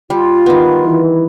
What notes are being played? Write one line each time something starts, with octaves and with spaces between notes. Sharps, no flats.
G3 F4
D#3 B3
E3